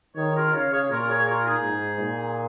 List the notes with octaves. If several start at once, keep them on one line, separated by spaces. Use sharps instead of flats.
D#3 G#4 C#5
F4 A#4
C#3 C#5 F5
G#4 C#5
A#2 F4 A#4
G#4 C#5
F4 A#4
D#4 G#4
G#2
A#2